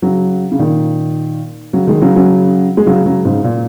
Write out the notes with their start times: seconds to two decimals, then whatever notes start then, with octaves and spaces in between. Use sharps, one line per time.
0.02 C#3 F#3
0.52 C#3
0.59 A#2 D#3
1.73 C#3 F#3
1.87 D#3 G#3
2.02 C#3 F#3
2.16 C#3 F#3
2.77 G#3
2.87 C#3 F#3
3.06 C#3 F#3
3.25 G#2 C#3
3.44 A#2